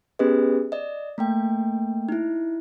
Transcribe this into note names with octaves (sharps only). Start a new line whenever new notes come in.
B3 C#4 G4 G#4 B4 D#5
D5 D#5
A3 A#3 G5
D#4 E4